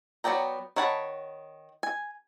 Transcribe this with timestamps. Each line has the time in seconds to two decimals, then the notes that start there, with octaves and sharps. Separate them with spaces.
0.24 F#3 B3 D5 G5 A#5
0.76 D#3 C#5 F#5 A5 B5
1.83 G#5